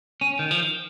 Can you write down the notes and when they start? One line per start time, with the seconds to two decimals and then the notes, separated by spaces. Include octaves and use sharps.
0.21 C#4
0.39 D#3
0.51 F3